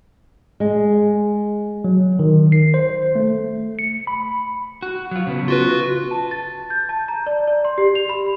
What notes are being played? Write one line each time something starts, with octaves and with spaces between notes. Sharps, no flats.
G#3
F#3
D#3
C7
C5
A3
C#7
B5
F#4
F#3 F4
C#3 B3
F4 F#4 B4
A5
A6
G6
A5
A#5
D5
D5
C6
G4
F7
B5